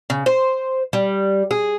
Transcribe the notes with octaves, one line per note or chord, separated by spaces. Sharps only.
C#3
C5
G3
G#4